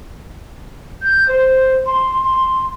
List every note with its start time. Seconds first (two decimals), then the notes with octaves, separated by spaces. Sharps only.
1.02 G6
1.28 C5
1.86 C6
2.23 C6